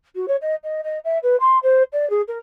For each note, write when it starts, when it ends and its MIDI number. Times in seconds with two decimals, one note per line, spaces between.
0.15 0.25 66
0.28 0.36 73
0.41 0.55 75
0.63 0.81 75
0.83 0.98 75
1.04 1.18 76
1.22 1.36 71
1.40 1.58 84
1.62 1.82 72
1.92 2.08 74
2.09 2.21 68
2.27 2.38 70